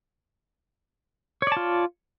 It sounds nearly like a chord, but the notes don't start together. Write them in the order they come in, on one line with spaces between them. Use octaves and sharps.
C#5 D5 A5 F4